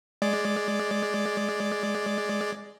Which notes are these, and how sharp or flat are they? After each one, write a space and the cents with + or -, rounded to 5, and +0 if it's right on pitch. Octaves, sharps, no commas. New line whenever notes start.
G#3 +5 D5 +0